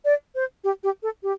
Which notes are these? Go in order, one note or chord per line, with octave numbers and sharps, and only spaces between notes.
D5
C5
G4
G4
A4
G4